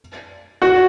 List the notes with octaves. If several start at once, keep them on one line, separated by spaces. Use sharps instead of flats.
F#4